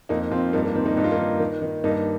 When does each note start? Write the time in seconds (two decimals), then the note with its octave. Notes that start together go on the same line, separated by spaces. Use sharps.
0.09 F2 A#3 D#4
0.31 F2 C4 F4
0.53 G2 A#3 D#4
0.65 A#3
0.75 D#3 C4
0.86 A#3 D#4
0.97 G2 D#4
1.04 F4
1.12 A#3 D#4
1.19 D#3
1.40 D#3
1.62 D#3
1.84 G2 A#3 D#4